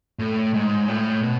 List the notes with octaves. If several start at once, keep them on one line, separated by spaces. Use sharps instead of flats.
A2
G#2
A2
B2